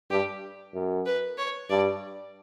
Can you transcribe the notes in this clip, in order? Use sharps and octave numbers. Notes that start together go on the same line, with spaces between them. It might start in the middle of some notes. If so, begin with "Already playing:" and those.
G2 G4
F#2
B4
C#5
G2 D5